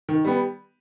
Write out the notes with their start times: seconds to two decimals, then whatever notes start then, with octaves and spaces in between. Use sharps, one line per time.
0.09 D#3
0.25 G3 B3